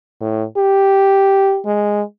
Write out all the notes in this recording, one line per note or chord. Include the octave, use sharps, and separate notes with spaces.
A2
G4
G#3